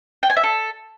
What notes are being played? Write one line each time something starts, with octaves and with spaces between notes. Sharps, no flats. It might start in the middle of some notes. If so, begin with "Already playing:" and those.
G5
G#5
E5
A4